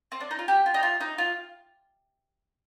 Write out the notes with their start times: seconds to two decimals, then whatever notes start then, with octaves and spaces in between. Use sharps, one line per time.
0.12 C4
0.21 D4
0.31 D#4
0.39 F4
0.48 G4
0.66 F4
0.74 D#4
0.83 F4
1.01 D#4
1.18 F4